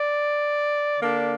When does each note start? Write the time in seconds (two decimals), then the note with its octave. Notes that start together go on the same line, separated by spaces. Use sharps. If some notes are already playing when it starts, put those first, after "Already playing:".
Already playing: D5
0.98 D3 A#3 D4